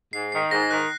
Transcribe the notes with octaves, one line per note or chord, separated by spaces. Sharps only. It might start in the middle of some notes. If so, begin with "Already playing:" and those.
G#2 C7
D#3 C7
G#2 A#6
D#3 F#6